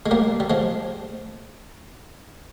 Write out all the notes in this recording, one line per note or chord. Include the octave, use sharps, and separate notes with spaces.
G#3
G3 A#3
G3
F3 G#3